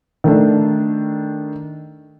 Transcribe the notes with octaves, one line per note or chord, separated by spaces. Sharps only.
D#3 A3 D4